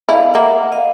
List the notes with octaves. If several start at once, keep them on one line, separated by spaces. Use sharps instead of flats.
E4 D#5 F5
A#3 E5 F#5
D#5 F5